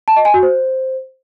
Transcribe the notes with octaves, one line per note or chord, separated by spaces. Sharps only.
A5
D#5
G#5
F#4
C5